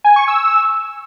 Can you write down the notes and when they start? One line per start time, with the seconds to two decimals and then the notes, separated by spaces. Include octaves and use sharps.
0.04 G#5
0.16 C#6
0.28 E6